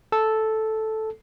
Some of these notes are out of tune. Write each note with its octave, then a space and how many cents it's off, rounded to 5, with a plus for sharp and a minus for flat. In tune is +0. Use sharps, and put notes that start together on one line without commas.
A4 -5